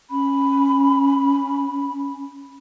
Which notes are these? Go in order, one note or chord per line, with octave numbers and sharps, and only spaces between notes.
C#4 B5